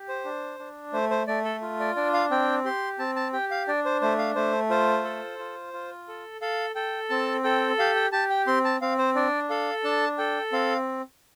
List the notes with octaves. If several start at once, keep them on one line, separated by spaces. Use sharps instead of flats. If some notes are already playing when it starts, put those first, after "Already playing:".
Already playing: G4
C5
D4
D4
A3 C5
C5
A3 D5
A4
F4
D5
D4 D5
F5
C4 G5
G4 C6
C4 A5
A5
G4 G5
F5
D4 D5
C5
A3 C5
F5
A3 C5
F4 C5
A4
F4
F4
A4
A4 F5
A4 G5
C4 A5
A4 G5
G4 F5
G5
G4 A5
G5
C4 C6
A5
C4 F5
C5
D4 D5
A4 F5
D4 A5
A4 G5
C4 F5